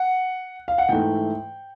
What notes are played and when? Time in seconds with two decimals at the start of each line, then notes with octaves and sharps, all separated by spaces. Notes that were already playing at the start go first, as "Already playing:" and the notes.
Already playing: F#5
0.68 F5
0.78 F#5
0.89 G#2 E3 A3 G5